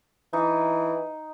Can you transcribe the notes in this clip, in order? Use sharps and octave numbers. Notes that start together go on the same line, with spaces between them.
E3 D#4